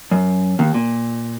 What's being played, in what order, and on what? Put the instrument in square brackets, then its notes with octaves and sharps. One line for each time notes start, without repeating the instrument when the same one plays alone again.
[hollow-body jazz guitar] F#2
D#2
A#2